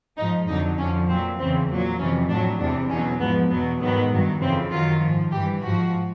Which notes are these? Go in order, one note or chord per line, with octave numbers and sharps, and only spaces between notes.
G#2 F3 D#4
F2 D3 F#3 D#4
F2 D3 F3 C#4
A#2 F#3 C4
E2 C#3 E3 C4
A#2 F#3
F2 C3 E3 C#4
A2 F#3 D4
E2 C3 E3 D4
E2 B2 F#3 C#4
G#2 F3 B3
E2 B2 F#3 B3
G#2 D#3 F#3 B3
G2 D#3 F#3
F2 C#3 E3 C4
F#2 D#3 F#3 F4
G#2 F3
G2 E3 G4
G#2 F3 F#4